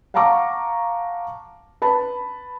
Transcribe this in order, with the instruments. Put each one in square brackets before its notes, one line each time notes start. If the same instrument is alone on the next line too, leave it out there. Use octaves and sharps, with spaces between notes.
[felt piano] F5 F#5 A5 A#5 C#6 D6
B4 A5 B5